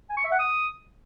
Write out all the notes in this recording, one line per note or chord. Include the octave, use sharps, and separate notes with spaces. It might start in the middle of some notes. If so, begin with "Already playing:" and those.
G#5
C#6
E5
F#5
D#6